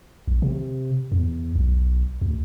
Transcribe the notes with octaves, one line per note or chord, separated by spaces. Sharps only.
A#1
C3
E2
B1
D2